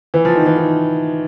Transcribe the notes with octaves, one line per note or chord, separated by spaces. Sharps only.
E3
F3
D#3
E3
D#3